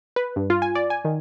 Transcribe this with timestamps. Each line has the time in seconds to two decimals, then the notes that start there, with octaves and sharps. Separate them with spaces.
0.16 B4
0.36 G2
0.50 F4
0.62 G#5
0.75 D5
0.90 G#5
1.05 D#3